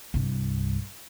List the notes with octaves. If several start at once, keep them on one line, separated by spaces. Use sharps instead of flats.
C2 G2